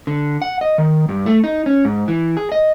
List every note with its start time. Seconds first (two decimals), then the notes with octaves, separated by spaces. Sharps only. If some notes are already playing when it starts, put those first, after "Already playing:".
0.07 D3
0.42 F#5
0.61 D#5
0.78 D#3
1.09 G2
1.26 A3
1.44 D#4
1.66 C#4
1.85 G#2
2.08 E3
2.37 G#4
2.52 D#5